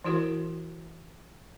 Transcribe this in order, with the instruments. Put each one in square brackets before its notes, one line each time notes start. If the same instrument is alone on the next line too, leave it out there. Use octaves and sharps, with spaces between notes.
[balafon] E3 E4 F#4 A#4